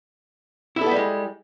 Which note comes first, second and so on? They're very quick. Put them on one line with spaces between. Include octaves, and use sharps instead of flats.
E4 A4 B3 G3 G#3